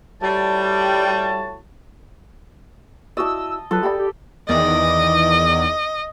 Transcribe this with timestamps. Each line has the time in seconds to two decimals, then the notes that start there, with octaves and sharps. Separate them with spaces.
0.22 A2 G3 F#4 A5
3.17 E4 F#4 D5 D#5 A5 E6
3.71 F#3 F4 A4 B4
3.83 G4 D5 G5 B5
3.99 G4
4.49 E2 D#3 D5 D#5